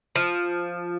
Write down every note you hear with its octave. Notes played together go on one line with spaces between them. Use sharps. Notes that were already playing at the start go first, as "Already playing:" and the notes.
F3